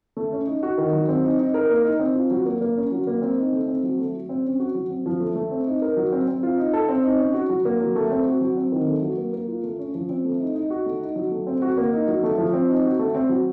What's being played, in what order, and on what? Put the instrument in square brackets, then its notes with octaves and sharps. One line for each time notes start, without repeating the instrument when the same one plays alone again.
[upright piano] A3
C#4
D#4
F#4
D#3
F#3
C4
D#4
D#4
A#4
A#3
D#4
C4
F4
F#3
A#3
A#3
C#4
F#3
A#3
C4
D#4
A3
C4
F#3
A3
F#3
C4
C#4
F#4
F#3
C4
F3
A3
A3
C4
D#4
A#4
F#3
C4
C4
F4
D#4
A4
C4
D#4
C#4
F#4
F#3
A#3
F#3
A3
C4
F#4
F#3
C4
D#3
A3
F#3
A#3
A#3
F4
A3
C#4
F3
C4
A3
D#4
D#4
F#4
A3
D#4
F#3
A3
C4
F#4
A#3
D#4
F#3
A3
F3
C4
D#4
F#4
A3
C4
F#3